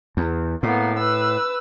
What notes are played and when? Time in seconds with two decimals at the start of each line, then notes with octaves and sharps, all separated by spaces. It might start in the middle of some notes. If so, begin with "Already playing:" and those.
0.17 E2
0.63 A2 A#3 B3
0.98 B4 E6